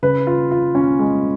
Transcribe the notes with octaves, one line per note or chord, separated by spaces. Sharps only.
C#3 B4
F4
F4
C#4
G#3